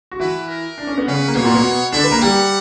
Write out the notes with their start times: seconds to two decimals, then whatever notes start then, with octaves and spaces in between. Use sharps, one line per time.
0.12 F#4
0.20 E3 E4 B4
0.48 A#4
0.78 D4
0.87 C#4
0.98 B3
1.07 C#3 C#4 B4
1.28 A#3
1.35 B2 B3 C#5
1.44 A#2 A#3
1.54 B2 B3
1.92 D3 D4 E5
2.04 B4
2.11 A#3 A#4
2.22 G3 G4 F#5